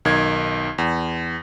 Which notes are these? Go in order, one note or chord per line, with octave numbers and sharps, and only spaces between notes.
B1 D#3 G#6
E2